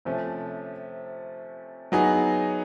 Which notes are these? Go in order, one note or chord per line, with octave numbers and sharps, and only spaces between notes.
C3 F3 A3 C#4
F#3 B3 D#4 G#4